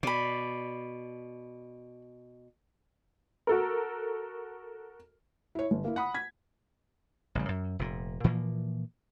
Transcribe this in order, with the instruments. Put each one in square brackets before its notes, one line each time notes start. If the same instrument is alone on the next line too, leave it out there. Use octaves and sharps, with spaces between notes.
[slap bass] B2 [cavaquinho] D5 B5
[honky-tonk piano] F#4 A4 A#4
[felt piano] E4 C#5
G1
A#3 E4
F#5 B5 D#6
G#6 B6
[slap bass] A1 C#3 G3
F#2
F1 A#2
A#2 E3 F3 A#3